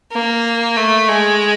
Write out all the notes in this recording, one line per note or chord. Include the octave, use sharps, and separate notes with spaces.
A#3
A3
G#3